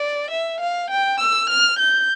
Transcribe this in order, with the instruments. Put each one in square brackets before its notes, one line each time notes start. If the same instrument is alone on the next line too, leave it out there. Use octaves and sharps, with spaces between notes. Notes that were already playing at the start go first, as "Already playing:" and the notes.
Already playing: [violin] D5
E5
F5
G5
E6
F6
G6